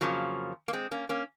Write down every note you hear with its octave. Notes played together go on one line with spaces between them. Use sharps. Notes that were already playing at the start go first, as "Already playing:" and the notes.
F2 C#3 F3 F#3 A#3
A#3
G#3 C4
A#3 C#4
A#3 C#4